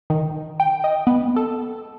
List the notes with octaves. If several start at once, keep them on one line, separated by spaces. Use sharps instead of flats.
D#3
G5
D#5
B3
A4